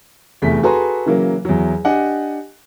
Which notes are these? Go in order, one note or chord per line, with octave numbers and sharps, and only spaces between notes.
F1 E2 A3 B6
F#4 G#4 A4 B4 A#5 C6
C#3 E3 F#3 A#3
E2 F#3
D4 G4 D#5 F#5 G#5